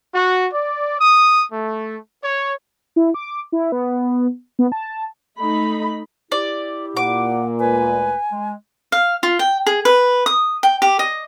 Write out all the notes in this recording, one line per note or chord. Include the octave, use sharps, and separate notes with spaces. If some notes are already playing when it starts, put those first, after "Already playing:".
F#4
D5
D#6
A3
C#5
E4
D6
E4
B3
B3
A5
A3 D#4 B5
E4 G4 D5
A#2 F#5 D6
D2 G#3 B4 G#5
G#3
F5
F4
G5
G#4
B4
D#6
G5
G4
D#5